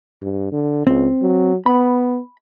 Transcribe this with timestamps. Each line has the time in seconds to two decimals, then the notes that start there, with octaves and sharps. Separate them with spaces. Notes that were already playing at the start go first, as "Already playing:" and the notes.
0.22 G2
0.52 D3
0.87 C#2 C4
1.22 F#3
1.66 B3 B5